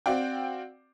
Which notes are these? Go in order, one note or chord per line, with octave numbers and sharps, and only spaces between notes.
C4 F#4 D5 F5 G5